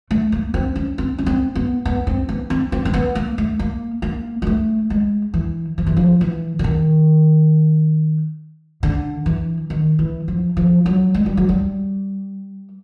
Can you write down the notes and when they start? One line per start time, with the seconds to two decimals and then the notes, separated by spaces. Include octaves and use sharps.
0.11 A3
0.32 A#3
0.54 C4
0.76 C#4
0.98 C4
1.18 C#4
1.26 C4
1.55 B3
1.85 B3
2.07 C4
2.29 B3
2.50 C4
2.72 C4
2.85 C4
2.94 B3
3.15 A#3
3.38 A3
3.59 A#3
4.02 A#3
4.42 G#3
4.47 A3
4.90 G#3
5.34 E3
5.78 F3
5.86 E3
5.97 F3
6.21 E3
6.59 D3
6.64 D#3
8.83 D3
9.26 E3
9.70 D#3
9.99 E3
10.28 F3
10.57 F3
10.86 F#3
11.14 G#3
11.26 G3
11.37 F#3
11.49 G3